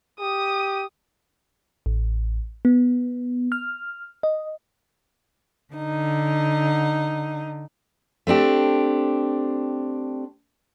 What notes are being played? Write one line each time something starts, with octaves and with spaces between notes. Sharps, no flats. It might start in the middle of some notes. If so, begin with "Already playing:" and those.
G4 D#6
A1
B3
F6
D#5
D3 D#4
A3 C4 D4 G4